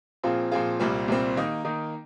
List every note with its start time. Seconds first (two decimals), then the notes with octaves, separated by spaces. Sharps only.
0.23 A#2 F3 C4 F4 G#4
0.51 A#2 F3 C4 F4 G#4
0.80 C2 A#2 G3 C4
1.08 C2 A#2 G3 C4
1.36 D#3 A#3 D#4
1.65 D#3 A#3 D#4